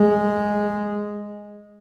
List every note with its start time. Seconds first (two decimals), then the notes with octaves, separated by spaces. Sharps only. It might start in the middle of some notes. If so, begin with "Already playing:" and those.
Already playing: G#3